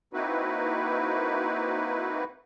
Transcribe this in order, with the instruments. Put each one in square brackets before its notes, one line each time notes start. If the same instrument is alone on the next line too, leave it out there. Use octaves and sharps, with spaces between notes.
[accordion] A#3 C4 D#4 E4 F#4 B4